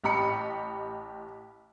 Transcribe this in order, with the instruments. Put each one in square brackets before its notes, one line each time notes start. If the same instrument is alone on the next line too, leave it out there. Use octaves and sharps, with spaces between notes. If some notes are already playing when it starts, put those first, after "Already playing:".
[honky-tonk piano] A1 G4 D#5 B5 C#7